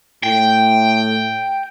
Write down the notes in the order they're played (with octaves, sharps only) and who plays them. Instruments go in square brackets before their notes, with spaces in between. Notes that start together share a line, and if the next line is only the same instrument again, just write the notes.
[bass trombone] A2 [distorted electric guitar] G5